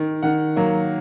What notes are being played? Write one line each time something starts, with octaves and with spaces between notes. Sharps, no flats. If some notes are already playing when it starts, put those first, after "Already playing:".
Already playing: D#3
D#3 F#5
F#3 A#3